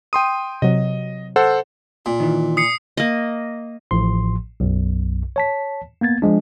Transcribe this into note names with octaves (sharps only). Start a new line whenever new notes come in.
G5 C6 D#6 D#7
C3 F#3 D#5
A4 C5 F#5
A#2 F4
D#3 E3
D#6 C7 C#7
A#3 D#5
A1 A2 F3 C6
B1 F#2
C#5 A5 B6
A#3 B3 G#6 A6
F3 G#3 D4